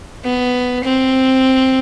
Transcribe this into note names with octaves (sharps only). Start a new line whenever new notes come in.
B3
C4